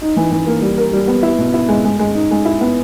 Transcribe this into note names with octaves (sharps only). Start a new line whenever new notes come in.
D#4
E3
E3
A#3
G3
A#4
G3
B3
E4
B2
E4
G#3
G#3
G#3
D#4
G#3
E4
B3